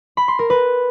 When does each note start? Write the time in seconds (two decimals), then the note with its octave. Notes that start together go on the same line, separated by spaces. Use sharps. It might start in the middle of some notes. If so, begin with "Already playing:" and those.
0.17 B5
0.28 C6
0.39 A#4
0.50 B4